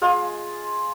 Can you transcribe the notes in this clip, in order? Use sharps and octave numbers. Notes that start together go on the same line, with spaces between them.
G#3 F4 G#4